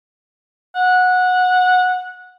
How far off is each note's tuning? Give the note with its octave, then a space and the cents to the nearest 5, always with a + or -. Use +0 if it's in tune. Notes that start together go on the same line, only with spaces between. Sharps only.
F#5 -15